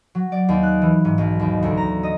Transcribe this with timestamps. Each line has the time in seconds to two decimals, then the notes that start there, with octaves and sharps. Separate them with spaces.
0.15 F#3
0.32 D5
0.49 D#2
0.63 F#6
0.82 E3
1.05 G#2
1.18 B1
1.40 D#2
1.63 D2
1.77 A#5
2.03 D#5